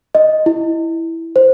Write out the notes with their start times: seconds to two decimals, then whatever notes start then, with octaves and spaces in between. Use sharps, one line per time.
0.15 D#5
0.46 E4
1.36 C5